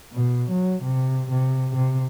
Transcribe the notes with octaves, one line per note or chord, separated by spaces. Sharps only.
B2
F#3
C3
C3
C3